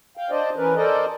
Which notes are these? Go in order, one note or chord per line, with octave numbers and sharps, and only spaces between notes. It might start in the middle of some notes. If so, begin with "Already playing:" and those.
F5 G5
D4 C5 D5 D#5
E3 C#4 A#4 B4
A4 A#4 C5 D5 D#5